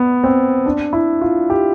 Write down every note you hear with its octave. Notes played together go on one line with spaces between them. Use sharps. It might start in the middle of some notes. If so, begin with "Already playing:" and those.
Already playing: B3
C4
D4
E4
F4
G4